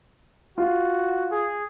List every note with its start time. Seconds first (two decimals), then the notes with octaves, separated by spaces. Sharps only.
0.58 F4 F#4
1.31 G#4